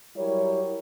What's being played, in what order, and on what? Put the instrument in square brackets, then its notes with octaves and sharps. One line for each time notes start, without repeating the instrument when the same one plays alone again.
[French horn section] F#3 G3 E4 A#4 C#5